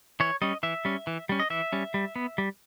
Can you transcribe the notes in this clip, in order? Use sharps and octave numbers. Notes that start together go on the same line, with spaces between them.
E3 C#5
G3 C#4 D#5
E3 E5
G3 C#4
E3
G3 C#4
D#5
E3 E5
G3 C#4
G3
B3
G3